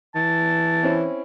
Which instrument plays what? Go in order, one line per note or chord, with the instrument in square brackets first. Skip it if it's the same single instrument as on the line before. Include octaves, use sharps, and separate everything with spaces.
[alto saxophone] E3 [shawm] A5
[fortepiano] C4 C#4 E4